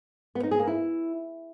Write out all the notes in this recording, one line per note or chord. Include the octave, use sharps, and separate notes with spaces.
B3
D#4
G#4
A#3
E4